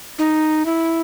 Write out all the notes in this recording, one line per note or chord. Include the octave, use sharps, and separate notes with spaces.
D#4
E4